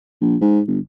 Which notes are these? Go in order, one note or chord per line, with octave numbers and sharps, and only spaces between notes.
A#1
G#2
G1